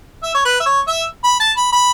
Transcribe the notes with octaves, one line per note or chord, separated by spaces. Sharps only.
E5
C#5
B4
E5
C#5
E5
B5
A5
B5
B5